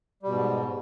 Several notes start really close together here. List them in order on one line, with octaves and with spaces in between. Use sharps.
G3 B2 G#2